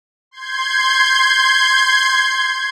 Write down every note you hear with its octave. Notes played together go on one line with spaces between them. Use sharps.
C6 G6 G#6